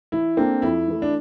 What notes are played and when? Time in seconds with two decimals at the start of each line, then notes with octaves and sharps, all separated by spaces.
0.12 E3 E4
0.37 A#3 C4 D4 A4
0.62 F2 E4
0.88 E3 A3
1.02 D4